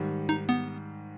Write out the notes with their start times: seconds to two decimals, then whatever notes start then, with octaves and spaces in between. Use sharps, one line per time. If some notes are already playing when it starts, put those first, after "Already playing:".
Already playing: G#2 D#3 G3
0.29 D#4
0.49 B3